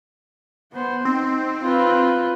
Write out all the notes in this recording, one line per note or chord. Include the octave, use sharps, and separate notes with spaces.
B3 C5
C4 D#4
F4 B4